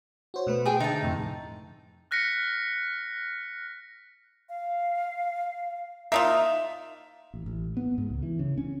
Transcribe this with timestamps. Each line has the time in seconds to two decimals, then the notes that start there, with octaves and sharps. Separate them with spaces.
0.34 F#4 C5 C#5
0.47 B2 A3 B4
0.66 G#4 G5 D#6
0.80 D3 D#4 E5 A5
1.03 F2 A2 C3
2.11 F6 F#6 A#6 B6 C#7
4.49 F5
6.12 A#3 D#4 F4 E5
7.34 A1
7.46 A1
7.77 B3
7.98 G#2
8.10 C#2
8.23 E3
8.39 C#3
8.58 C#4